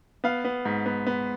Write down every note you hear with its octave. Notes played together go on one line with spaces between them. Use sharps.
B3 F5
B3
G#2
B3
B3